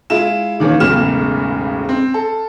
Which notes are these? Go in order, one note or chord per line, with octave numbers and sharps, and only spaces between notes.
G#3 E4 F4 E7
D#3 E3 A#3 C#4
E1 B1 A2 C#3 F6 E7
C4
A4